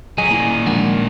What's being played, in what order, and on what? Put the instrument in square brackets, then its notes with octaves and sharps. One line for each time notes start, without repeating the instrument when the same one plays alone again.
[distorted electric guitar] F#3 C#4 [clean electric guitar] G#4 [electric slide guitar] D#5
[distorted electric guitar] A#2 D#3 [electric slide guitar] A#3 E4
[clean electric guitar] F3 F#3 F#4 [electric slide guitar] G#3 D4 A#4